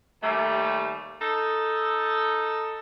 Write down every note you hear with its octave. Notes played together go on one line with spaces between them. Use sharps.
D#2 G3 A3
D#4 A4